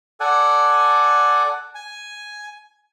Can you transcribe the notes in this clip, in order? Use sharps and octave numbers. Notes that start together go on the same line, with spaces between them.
A4 D5 F#5 G#5
G#5